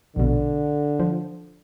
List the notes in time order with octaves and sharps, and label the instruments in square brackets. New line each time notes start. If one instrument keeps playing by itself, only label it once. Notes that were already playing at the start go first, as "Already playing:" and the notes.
[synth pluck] A#1 B2 [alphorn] D3
[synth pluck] F3